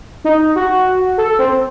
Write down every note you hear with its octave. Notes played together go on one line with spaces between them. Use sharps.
D#4
F#4
A4
C4